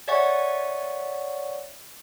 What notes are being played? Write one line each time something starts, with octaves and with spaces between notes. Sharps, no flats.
C#5 D5 E5 F#5 G#5 C#6